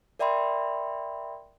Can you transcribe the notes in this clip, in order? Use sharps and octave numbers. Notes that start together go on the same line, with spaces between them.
A#4 D5 E5 G5 B5 C6